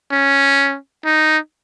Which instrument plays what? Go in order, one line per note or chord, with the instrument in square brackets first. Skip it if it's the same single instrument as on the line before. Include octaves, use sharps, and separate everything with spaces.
[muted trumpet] C#4
D#4